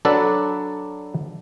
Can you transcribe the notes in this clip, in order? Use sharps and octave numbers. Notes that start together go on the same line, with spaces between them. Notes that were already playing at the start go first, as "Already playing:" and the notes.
F#3 D4 A4 B4 D5 F#5